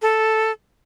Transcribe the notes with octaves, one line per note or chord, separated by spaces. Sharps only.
A4